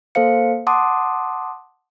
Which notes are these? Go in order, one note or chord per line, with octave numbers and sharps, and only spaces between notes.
A#3 A4 C5 F5 C#7
F#5 A5 C6 D6 D#6